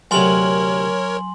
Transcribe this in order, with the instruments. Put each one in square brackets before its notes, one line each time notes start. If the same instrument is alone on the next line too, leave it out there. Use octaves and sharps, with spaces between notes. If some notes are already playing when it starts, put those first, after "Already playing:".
[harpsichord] D2 C3 [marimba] F#3 [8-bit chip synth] A#4 C#5 [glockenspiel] G#5 C6 F#7